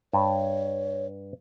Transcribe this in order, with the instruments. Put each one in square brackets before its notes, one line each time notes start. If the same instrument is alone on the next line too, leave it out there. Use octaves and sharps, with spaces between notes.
[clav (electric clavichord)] G2 [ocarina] C#5